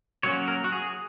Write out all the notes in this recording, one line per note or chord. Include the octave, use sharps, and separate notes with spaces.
F#3 A#3 C#4 C#5
A#4
F#4
G#4